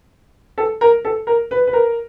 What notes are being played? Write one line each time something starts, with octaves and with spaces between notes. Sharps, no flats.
A4
A#4
A4
A#4
B4
B4
A#4